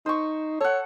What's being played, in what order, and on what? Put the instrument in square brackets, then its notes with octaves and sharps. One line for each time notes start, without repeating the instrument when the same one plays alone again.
[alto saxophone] D#4 [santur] C5 C#6
[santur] A4 F#5 [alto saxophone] C#5